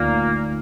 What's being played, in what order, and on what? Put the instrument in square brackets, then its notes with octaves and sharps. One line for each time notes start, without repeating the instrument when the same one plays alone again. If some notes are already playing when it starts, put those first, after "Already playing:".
Already playing: [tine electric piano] D2 D3 A3 D#4 [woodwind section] A#2 A#3